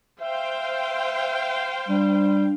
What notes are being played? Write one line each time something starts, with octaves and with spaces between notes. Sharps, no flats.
C5 E5 F5 G5
G3 D4